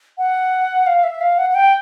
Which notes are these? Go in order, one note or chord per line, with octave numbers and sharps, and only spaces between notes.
F#5
F5
E5
F5
F#5
F#5
G5